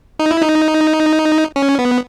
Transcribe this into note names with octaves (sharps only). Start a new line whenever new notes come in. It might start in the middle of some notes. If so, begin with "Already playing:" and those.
D#4
E4
D#4
C#4
B3